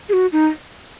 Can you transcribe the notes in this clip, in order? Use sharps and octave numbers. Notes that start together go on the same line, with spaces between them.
G#4
F#4
D#4